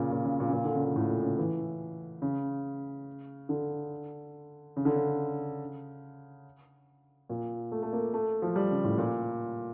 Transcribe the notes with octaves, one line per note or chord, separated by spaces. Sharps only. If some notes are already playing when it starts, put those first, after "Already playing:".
Already playing: A#2 C#3
A#2
C#3
A#2
C#3
A#2
D3
C#3
A#2
A2
A#2
C#3
E3
C#3
D3
C#3
D3
C#3
A#2
A3
A3
A#3
A3
F3
G3
C#3
A2
A#2